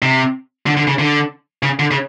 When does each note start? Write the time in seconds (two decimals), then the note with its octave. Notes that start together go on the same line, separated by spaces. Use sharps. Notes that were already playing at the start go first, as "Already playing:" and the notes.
0.02 C3
0.67 D3
0.77 D3
0.87 C#3
0.99 D3
1.63 C#3
1.79 D3
1.91 C#3